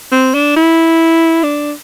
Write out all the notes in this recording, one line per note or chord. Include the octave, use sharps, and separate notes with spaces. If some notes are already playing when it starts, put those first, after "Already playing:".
C4
D4
E4
D4